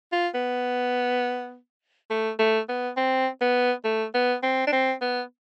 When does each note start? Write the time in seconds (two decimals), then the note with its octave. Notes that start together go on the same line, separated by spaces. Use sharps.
0.12 F4
0.34 B3
2.10 A3
2.39 A3
2.69 B3
2.97 C4
3.41 B3
3.84 A3
4.14 B3
4.43 C4
4.67 D4
4.72 C4
5.01 B3